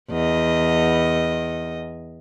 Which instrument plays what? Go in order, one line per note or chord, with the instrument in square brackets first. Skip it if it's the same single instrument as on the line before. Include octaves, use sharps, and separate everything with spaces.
[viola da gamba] E2 D#5